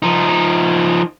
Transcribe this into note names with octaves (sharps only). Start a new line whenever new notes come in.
F3 D#4